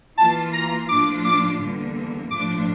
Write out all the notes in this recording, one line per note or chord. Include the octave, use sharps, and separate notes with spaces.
E3 A#3 F4 A5
A#5
A2 F3 A#3 D4 F4 D6
D6
E2 D3 G3 A#3
A2 F3 A3 D4 D6